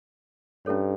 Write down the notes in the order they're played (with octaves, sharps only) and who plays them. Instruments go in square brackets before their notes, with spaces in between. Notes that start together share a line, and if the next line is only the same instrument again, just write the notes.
[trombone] G2 [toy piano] C#4 E4 A4 C#5